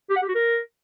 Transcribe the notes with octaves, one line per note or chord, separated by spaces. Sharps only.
G4
F#5
G4
F#4
A#4